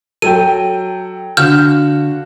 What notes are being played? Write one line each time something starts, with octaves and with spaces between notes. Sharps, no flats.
F#3 A4 G5 D#7
D3 F#4 F5 F6 G6 E7